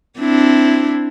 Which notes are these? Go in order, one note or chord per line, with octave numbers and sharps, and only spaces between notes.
C4 D4 E4